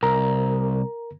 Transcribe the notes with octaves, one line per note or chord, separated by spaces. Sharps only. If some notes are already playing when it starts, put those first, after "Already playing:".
C2 A#4 A#5